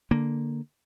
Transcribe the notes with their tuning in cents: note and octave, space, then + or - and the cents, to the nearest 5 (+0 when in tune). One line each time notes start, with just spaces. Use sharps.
D3 +0 A#3 +0